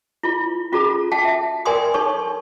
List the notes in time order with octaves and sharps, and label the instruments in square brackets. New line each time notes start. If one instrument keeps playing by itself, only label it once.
[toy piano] E4 F4
C#4 F4 F#4 G#4 A4 A#5
F#5 G5 A5
E5
A#4 D5 G5 G#5 C6 D#6
D#4 A4 C#5 C#6